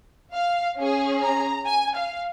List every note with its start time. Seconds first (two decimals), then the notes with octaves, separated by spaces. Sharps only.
0.33 F5
0.78 C#4 G#4
1.22 A#5
1.66 G#5
1.96 F5